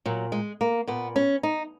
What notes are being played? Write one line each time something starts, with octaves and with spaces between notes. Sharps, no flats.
A#2 F#3
G#3
A#3
A#2 B3
C#4
D#4